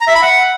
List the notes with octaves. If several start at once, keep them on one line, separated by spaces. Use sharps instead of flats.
A#5
E5
B5
F#5